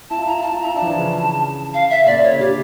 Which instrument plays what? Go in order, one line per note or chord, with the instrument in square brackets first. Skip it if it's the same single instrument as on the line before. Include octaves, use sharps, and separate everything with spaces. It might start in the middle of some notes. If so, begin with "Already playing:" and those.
[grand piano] E4 [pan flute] A5
[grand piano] F4
[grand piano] E4 [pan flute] A#5
[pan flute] A#5
[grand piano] F4 [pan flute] A5
[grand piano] F4
[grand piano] E4 [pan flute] A#5
[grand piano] D4 [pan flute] A5
[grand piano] F3
E3
C#3
C#3
[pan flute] F5
E5
[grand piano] C#3
[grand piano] A#2 [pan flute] D5
[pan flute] C#5
[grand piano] C#3
[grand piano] D3 [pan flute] G4